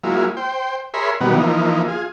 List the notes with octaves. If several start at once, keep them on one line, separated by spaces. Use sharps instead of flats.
F#3 G#3 A#3 E4 F4
C5 G5
G#4 A#4 C#5 E5 B5 C6
B2 D#3 F#3 G3 A#3 B3
E3 F3 A#3 D#4
F4 G#4